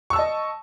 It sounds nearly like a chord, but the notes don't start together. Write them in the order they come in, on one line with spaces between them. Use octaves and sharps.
C#6 E6 A5 D#5